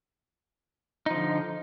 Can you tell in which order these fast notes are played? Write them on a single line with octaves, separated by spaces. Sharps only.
D#4 F3 D3